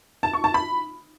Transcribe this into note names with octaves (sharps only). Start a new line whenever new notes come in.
A5
C#6
A5
B5